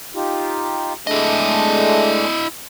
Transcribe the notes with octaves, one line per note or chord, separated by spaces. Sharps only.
D#4 F4 G4
G#3 A3 D4 E4 D#5